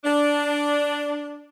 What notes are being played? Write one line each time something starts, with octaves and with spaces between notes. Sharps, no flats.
D4